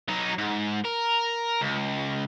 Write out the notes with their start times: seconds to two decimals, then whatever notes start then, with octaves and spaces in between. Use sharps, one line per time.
0.09 F#3 D#4
0.38 G#2
0.84 A#4
1.61 C#2